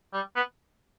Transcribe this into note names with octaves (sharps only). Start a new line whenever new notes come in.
G3
B3